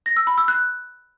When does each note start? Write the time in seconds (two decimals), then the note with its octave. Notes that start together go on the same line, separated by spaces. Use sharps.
0.06 A#6
0.17 E6
0.27 B5
0.38 E6
0.48 F#6